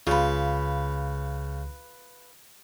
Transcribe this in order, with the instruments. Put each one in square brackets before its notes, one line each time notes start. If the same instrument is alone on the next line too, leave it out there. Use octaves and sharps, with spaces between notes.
[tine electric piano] C#2 [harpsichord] C#3 [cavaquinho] F4 B4